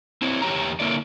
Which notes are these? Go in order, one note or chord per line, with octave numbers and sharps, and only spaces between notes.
C4 E4 C#5
E2 G4 C#5 A#5
D3 A#3 E4 C#5 D5